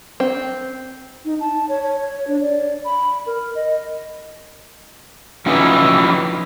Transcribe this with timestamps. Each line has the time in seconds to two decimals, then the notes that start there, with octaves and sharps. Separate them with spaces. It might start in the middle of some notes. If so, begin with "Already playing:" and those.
0.20 C4
1.24 D#4
1.40 A5
1.69 C#5
1.83 C#5
2.27 D4
2.41 D5
2.85 B5
3.26 A#4
3.55 D#5
5.46 F3 F#3 C#4 D#4 E4 B4